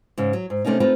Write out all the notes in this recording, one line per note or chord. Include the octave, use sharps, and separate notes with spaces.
G#2 C#3
F#3
G#2
C3 A3 A#3 C#4 D#4
A3 C4 D#4 F4 B4